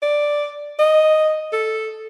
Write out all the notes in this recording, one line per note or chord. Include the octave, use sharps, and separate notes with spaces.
D5
D#5
A4